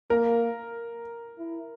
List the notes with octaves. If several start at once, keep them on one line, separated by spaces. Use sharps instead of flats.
A#3 A#4
E4